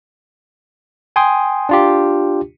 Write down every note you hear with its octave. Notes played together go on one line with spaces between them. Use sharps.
G5 G#5 C6 D#6
D4 F4 G4